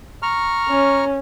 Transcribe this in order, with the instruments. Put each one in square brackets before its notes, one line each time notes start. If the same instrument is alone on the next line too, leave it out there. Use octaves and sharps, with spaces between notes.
[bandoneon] A#5 C#6 F6
[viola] C#4